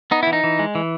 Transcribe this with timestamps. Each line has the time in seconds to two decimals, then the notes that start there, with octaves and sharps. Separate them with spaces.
0.11 B3 D#4
0.23 E3 E4
0.33 D#4
0.44 E3
0.59 G#3
0.75 E3